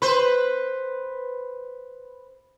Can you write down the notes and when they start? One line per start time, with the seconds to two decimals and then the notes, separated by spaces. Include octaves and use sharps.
0.02 B4 C5